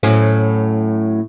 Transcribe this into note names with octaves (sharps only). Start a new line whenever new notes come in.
A2 F#3 C#4